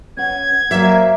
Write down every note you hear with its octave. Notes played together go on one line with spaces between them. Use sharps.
C#4 B4 F#5 G#6
F#3 A#3 C5 D5 E5